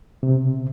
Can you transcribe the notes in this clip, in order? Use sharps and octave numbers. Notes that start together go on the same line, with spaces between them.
C3